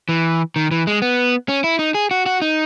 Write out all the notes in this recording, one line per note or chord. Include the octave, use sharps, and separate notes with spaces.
E3
D#3
E3
G#3
B3
C#4
E4
D#4
G#4
F#4
F#4
D#4